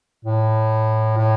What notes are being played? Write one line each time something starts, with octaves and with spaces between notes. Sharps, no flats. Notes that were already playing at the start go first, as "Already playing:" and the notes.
A2
A2